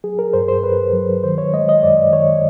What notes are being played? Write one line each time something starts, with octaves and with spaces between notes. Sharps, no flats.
F#3 G#4
A#4
G2 C5
C5
G2 B4
F#3
D#3 C5
C#5
G#3 D#5
D#5
F#2 D5
D#3 C#5